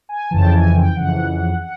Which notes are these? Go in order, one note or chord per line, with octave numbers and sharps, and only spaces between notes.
G#5
F2 C#3 E3 A5
G5
G#5
G5
F2 C#3 E3 F#5
F#5